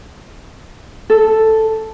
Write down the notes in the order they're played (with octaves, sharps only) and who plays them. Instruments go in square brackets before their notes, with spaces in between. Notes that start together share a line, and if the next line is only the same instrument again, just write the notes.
[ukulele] A4